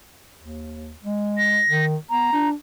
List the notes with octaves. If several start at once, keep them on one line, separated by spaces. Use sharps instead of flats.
D#2
G#3
A#6
D#3
B3 A#5
D4